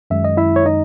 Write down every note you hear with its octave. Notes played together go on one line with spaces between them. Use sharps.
F#2 D#3 G#3 E5
D#5
E4 E5
C#5
D#4 D#5